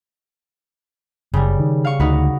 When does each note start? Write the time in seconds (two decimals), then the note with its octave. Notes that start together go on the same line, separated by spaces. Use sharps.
1.34 F#1 C#3 G3
1.60 D#3
1.85 F5 C#6
2.00 D2 D#4 F#4 B4